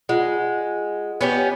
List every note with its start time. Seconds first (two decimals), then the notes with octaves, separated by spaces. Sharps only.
0.09 G#3 F4 F#5
1.21 B3 C#4 G4